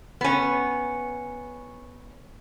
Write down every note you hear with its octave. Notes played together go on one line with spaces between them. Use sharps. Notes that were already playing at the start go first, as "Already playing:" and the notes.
B3 C#4